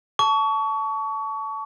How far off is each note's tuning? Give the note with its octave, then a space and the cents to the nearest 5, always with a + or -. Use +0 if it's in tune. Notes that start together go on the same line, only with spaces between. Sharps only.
A5 +0 C#6 +30